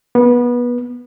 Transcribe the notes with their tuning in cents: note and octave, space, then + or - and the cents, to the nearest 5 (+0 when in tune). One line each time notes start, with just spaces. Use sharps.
B3 -25